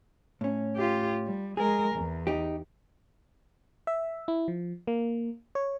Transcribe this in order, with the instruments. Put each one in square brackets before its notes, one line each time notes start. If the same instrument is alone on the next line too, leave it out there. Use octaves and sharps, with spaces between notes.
[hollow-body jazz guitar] A2 C#4
[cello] F4 G4
G3
[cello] G#3 A#4 [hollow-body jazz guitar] G#4
[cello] E2
[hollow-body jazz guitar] D#4 G4
[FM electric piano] E5
E4
F3
A#3
C#5